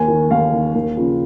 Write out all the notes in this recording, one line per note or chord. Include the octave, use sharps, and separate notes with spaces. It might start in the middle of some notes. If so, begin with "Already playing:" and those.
Already playing: D#2 G#5
D#3
D#2 F5
D#3
D#2
C#3 F3